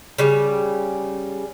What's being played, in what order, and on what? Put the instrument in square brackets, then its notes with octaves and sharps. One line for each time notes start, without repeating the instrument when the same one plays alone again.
[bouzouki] C#3 G3